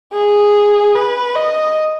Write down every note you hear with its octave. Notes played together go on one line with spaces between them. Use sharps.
G#4
B4
D#5